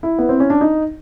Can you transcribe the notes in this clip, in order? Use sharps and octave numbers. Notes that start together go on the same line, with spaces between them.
E4
B3
C4
C#4
D4
D#4